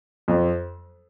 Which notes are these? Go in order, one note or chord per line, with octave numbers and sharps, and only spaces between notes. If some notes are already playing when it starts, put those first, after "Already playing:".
F2